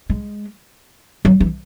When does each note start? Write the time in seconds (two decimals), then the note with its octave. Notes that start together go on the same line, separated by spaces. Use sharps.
0.10 G#3
1.25 F#3
1.40 E3